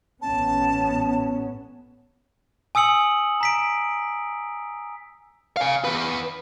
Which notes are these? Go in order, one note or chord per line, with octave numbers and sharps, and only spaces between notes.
A1 B3 C#4 A5
G#5 D#6 E6 C#7 F#7
A#5 B6 D7
F5 G#5
E2 B4